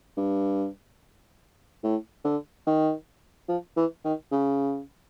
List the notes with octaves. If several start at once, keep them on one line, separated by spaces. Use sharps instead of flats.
G2
A2
D3
D#3
F3
E3
D#3
C#3